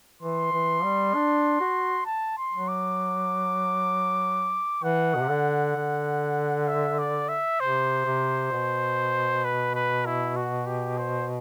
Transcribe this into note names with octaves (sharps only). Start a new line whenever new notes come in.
E3 C6
E3
G3
D4
F#4
A5
C6
F#3
D6
E3 F#5
B2
C3
D3
D3
E5
D5
E5
C3 C5
C3
B2
B4
B4
E4
F#4
G4
C5